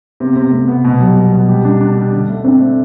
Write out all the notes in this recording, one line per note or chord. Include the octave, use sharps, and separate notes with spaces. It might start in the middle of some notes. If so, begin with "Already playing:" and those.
C3 B3
C3
C3 A3
B3
B2
F#3 G3
B3
B2
G3 G4
D4
D4
G3
D3
A3
C4 D4
A3